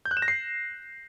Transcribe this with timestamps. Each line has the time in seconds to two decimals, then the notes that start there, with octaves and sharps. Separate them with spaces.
0.05 G6
0.11 F#6
0.17 E7
0.22 A#6
0.28 C7